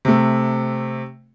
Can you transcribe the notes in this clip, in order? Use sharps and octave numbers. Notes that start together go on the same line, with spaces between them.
C3 A3